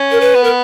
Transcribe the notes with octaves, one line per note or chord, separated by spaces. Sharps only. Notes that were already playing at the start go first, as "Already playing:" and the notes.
Already playing: C#4
A#4
B4
B3
A#4